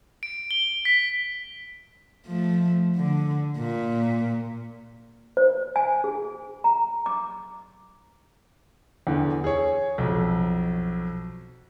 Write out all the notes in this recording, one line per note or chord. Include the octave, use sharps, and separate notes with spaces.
D7
G7
B6
F3 A3
D3
A#2
C5
G#5
G#4
A#5
D6
E2 D3
G#4 C#5
B1 F2